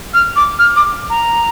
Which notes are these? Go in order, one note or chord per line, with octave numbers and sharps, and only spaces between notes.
F6
D6
F6
D6
A#5